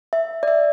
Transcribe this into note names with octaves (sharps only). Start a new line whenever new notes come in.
E5
D5
E5